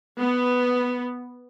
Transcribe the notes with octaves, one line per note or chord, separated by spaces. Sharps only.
B3